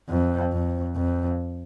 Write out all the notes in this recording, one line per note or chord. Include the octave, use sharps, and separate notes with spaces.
F2
F2
F2